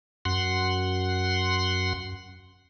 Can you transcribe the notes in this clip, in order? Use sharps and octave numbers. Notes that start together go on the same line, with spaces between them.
F#2 F#5 C6